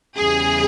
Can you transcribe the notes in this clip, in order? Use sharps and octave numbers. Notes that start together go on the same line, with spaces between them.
E2 C#3 E3 G3 G#4